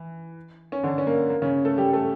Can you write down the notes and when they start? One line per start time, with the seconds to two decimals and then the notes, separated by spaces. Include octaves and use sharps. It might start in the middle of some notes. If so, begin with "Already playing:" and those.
Already playing: E3
0.72 C#4
0.83 D3 D4
0.98 C#4
1.07 A#3
1.30 A#3
1.42 C#3 C#4
1.65 A3 A4
1.78 G3 G4
1.93 A3 A4